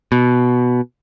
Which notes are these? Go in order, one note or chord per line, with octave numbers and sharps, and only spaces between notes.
B2